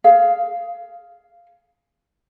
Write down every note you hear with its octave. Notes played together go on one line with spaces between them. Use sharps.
G#4 F5